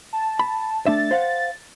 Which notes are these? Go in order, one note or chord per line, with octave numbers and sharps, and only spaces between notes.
A5
B5
A3 D4 E5 A6
C5 F5 F#5